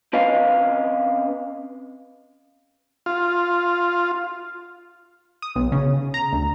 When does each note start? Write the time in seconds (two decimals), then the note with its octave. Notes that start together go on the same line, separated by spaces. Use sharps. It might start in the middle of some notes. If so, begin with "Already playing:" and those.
0.13 C4 C#4 B4 D#5 F5
3.06 F4
5.42 D#6
5.56 B1
5.72 C#3
6.14 A#5
6.33 D2